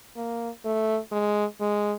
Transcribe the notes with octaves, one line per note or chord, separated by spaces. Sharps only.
A#3
A3
G#3
G#3